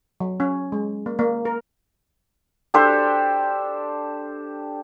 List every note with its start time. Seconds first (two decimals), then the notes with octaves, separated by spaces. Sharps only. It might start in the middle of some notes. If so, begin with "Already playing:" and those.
0.20 F#3
0.40 C#4
0.72 G#3
1.06 A#3
1.19 A#3
1.45 A#4
2.74 D4 G4 A4 C5